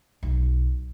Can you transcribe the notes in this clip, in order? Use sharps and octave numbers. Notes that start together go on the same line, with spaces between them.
B1